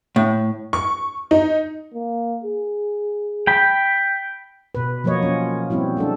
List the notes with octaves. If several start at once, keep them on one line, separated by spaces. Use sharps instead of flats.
A2
C#6
D#4
A#3
G#4
G5 B5
B2 B4
F3 F#3 A#3 B4 C#5 D#5
C#4 F4
G3 B3 C4 E4 F#4
G#3 D4 A4